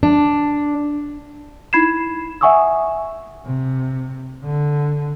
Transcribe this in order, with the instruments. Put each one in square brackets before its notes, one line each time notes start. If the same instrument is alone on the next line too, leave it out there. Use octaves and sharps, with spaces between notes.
[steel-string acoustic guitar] D4
[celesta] D#4 E4 B5 G#6 C7 E7
E5 F#5 G#5 C#6 D#6 E6
[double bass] C3
D3